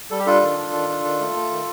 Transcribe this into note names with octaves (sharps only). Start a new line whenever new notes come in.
G3 A4
G4
D4 F4 A4
D#3
D4
D#3
D4
D#3
A3
A3
D#3